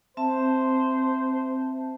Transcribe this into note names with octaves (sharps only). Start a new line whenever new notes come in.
C4 C5 E5 A5